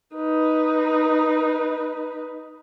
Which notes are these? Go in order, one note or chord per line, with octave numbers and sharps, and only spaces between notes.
D#4 B4